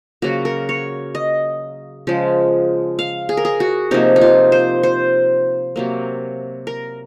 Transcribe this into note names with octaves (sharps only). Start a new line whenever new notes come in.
C#3 F#3 A#3 F#4
A#4
C#5
D#5
C#3 F3 G#3
F5
G#4
A#4
G#4
F#4
C3 F3 A#3 D#4
D#4
F4
C5
C5
C3 F#3 A#3
A#4